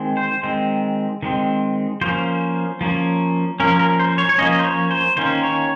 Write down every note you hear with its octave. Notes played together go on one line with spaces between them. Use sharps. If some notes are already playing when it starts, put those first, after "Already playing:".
Already playing: D#3 G#3 C4
C5
D#3 G#3 C4
D#3 G#3 C4
F3 A#3 C#4 C5
F3 A#3 C#4
F3 A#3 C#4 A#4
A#4
C5
C#5
C#5
F3 A#3 C#4 D#5
C5
C#5
C5
D#3 A#3 C#4 C5
C#5